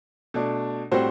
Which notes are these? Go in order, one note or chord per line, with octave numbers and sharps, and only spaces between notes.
B2 A3 D4
A2 G3 C4 F#4 C5